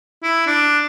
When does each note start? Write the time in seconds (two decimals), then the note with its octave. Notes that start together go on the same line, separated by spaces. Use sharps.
0.23 E4
0.47 D4